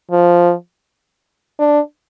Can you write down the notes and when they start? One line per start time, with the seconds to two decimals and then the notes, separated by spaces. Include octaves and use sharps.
0.11 F3
1.59 D4